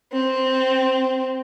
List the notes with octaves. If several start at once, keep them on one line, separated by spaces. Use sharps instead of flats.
C4